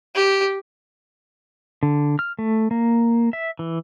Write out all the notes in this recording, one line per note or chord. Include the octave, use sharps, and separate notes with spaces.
G4
D3
F6
A3
A#3
E5
E3